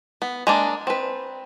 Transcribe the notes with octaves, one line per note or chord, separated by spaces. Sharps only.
B3
G#3 A#3 D4
C4 B4